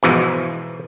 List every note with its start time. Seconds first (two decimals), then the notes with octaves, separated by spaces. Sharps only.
0.03 G#2 B2 E3 F3